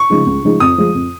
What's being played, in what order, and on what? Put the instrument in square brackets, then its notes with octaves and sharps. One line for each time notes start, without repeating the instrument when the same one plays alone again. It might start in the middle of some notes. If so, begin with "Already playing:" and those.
Already playing: [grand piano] C#6
[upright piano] C#3 F3 G#3 D#4
C#2
C#3 F3 G#3 D#4
[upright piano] F2 [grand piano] D#6
[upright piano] F3 G#3
F2